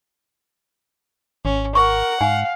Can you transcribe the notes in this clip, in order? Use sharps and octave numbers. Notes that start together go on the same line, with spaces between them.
G#1 C#4
A#4 F#5 C#6
G#2 F5 G#5